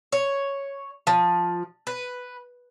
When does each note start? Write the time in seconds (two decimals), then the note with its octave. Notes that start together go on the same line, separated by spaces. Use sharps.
0.12 C#5
1.07 F3
1.87 B4